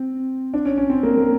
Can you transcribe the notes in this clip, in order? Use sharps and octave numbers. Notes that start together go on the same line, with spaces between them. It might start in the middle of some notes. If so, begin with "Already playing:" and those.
Already playing: C4
D4
C#4
C#4
C4
A#3
A#3